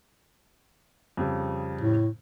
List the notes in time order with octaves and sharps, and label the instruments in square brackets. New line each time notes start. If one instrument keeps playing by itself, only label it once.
[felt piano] F2 C#3 G3
[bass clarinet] A2